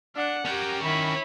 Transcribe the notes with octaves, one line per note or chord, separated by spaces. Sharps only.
D4 F#5
C#4 G4 A#4 G5
D#3 E4 B5 C#6